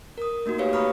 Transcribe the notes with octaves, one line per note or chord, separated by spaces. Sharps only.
A#4 D#6
A3 A#3 D#4 F#4
F#4 G4 B4 C#5 F5
A#5 B5 C#6 D#6 F6